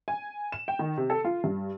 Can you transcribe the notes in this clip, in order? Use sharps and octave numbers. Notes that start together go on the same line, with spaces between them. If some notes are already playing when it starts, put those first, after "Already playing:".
G#5
E7
G5
D#3
C3
A4
F4
G2